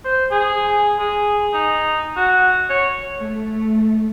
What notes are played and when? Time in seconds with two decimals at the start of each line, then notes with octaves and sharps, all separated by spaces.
0.05 C5
0.31 G#4
0.99 G#4
1.53 D#4
2.16 F#4
2.70 C#5
3.18 A3